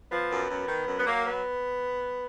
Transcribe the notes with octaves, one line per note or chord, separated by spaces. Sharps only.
F3 B3
F#2
F#2
D#3
F#2
B3
F#3 A#3
B3